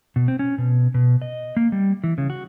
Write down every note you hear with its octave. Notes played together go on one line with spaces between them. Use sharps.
B2
C4
C#4
B2
B2
D#5
A#3
G3
E3
C#3
F#4